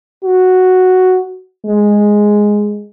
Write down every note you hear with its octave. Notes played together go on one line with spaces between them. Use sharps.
F#4
G#3